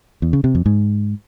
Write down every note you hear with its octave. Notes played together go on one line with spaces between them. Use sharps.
E2
C#3
C3
F2
G#2